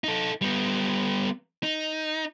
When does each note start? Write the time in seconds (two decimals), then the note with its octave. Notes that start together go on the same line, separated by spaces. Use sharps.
0.04 D#4 A4
0.42 G3 B3
1.63 D#4